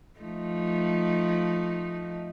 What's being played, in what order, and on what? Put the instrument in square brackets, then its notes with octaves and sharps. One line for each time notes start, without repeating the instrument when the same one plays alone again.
[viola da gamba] F3 A3 D#4